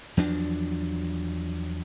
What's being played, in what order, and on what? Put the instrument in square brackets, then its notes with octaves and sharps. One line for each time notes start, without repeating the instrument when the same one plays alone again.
[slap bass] E2 F3 F#3 D4